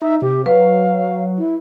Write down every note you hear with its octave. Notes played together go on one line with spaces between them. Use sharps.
D#4 E5
C3 G4
F#3 B4 F5
E4